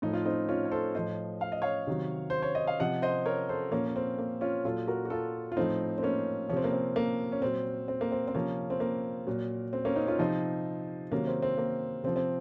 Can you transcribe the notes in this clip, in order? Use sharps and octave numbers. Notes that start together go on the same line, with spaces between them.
A2 F3 D#4
F4
C4 D#4
C#4 F4
C#5
A4 C5
A2 F3 C5 D#5
F5
D#5
C#5 F5
C3 D#3 F#3
C5
C#5
D#5
F5
C3 F3 D#5 F#5
C5 D#5
A#4 C#5
A4 C5
A#2 F3 A#3 C#4
C#4
C4
A#3
C#4 F4
A#2 F#3 F4 A4
F#4 A#4
F#4
F4 A4
F4
A2 F3 C4 D#4
C4
A#3 C#4
C3 F3 C4 C#4
A#3
C4
A#3
C#4
A#2 F#3 C4
C4
A#3
C4
C4
C3 F3 A#3 C#4
C4
A#3
A#2 F#3
C4
A#3 C#4
C4 D#4
C#4 F4
C3 F3 C4 D#4
C3 D#3 F#3 A#3 C#4
C4
C4
A#3
C3 F3 C4
C4